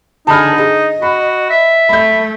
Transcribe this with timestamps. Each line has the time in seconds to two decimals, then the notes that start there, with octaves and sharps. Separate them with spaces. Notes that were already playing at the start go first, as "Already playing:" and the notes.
0.27 D3 D#4 G#4 A5 B5 F6
0.58 G#4 D#5
1.02 F#4 B5
1.50 E5
1.89 A3 B5 G6